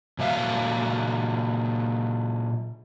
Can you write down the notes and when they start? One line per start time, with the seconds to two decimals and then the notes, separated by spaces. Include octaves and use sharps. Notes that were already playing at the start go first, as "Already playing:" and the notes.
0.19 A#2 F#3 E5 F5